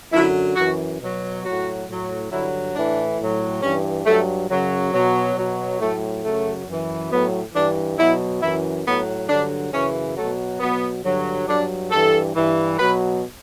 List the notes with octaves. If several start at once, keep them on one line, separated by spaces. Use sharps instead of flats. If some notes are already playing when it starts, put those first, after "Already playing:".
F#2 D3 F#3 E4
F#2 E3 F#4
B2 F#3
A2 F#3 F#4
A2 F#3
G2 D3 F#3 E4
A2 E3 D4
A2 F#3
G2 E3 C#4
G2 F#3 A3
F#2 C#3 F#3
B2 F#3
B2 F#3
A2 F#3 A3
F#2 C#3 F#3 A3
F#2 E3
A2 F#3 B3
G2 E3 D4
B2 F#3 E4
F#2 E3 E4
A2 F#3 B3
G2 D3 F#3 D4
F#2 C#3 E3 C#4
B2 F#3 A3
B2 F#3 B3
G2 D3 F#3
G2 F#3 D4
G2 E3 A4
G2 E3
B2 F#3 B4